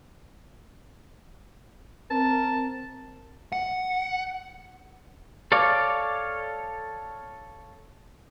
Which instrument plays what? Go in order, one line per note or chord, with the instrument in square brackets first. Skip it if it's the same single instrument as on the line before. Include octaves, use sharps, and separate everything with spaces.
[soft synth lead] C4 [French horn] A#4 [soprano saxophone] A5
[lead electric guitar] F#5
[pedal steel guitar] A4 C#5 D5 F5